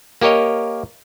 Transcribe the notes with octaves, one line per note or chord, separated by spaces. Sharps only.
A#3 G4 A#4 C#5 D#5